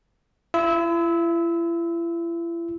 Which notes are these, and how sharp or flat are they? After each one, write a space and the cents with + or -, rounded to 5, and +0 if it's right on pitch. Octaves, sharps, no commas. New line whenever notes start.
E4 +40 E6 -20